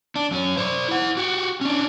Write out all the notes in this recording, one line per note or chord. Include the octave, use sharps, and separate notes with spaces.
D4
F#2 C#4
C5 D5
E4 F#5
F#4 G4
C#4 D4